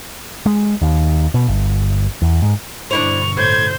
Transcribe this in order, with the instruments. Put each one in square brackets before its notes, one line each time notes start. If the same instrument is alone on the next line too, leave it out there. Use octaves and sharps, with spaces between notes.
[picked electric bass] G#3
D#2
B2
G1
E2
G#2
[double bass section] G2 B2 D3 [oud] D4 E4 C5 [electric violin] C#6 [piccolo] F7
[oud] A2 [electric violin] C5 G6 [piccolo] G#6